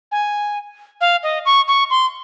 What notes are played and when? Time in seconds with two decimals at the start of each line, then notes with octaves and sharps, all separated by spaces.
0.12 G#5
1.01 F5
1.23 D#5
1.45 C#6
1.68 C#6
1.90 C6